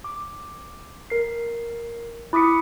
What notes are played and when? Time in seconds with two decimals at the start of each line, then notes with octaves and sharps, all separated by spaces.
0.04 D6
1.10 A#4 C7
2.33 E4 D6 D#6 B6 C#7